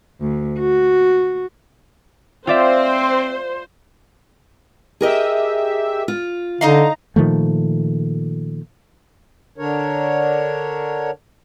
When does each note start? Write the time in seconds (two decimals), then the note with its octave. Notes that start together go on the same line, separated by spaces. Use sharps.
0.20 D2
0.59 F#4
2.47 C4 F4 C5 D5 E5
5.01 G4 G#4 A#4 D#5 E5
6.08 F4
6.61 D3 D#4 D#5 F5 A#5
7.16 A#2 D#3 F3 A3
9.58 D3 D4 A#4 C#5